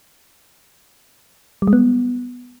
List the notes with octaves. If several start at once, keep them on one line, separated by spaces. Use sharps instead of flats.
G3
G#3
B3